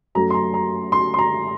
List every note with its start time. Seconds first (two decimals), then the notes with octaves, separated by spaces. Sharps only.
0.15 F#2 F#3 A3 A#5
0.30 C6
0.34 A#5
0.54 A#5
0.92 C6
1.14 C6
1.19 A#5